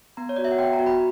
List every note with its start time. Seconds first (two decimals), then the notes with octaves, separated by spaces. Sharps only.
0.17 B3 A#5
0.29 C#5
0.36 F#4 D5
0.45 E5
0.52 F#5
0.58 B3 G5
0.73 A#5
0.79 F#4
0.86 B5